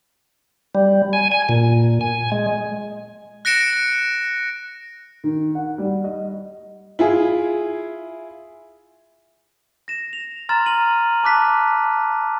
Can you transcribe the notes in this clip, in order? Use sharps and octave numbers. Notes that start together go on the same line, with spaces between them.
G3
G#5
G#5
A#2
G#5
G#3
F#6 A#6 C#7 D7 E7
D#3
F#5
G3
D#5
E4 F4 G#4
A#6 E7
F7
A#5 C6 F6 A6 E7
D#7 F#7
A5 D6 F#6 B6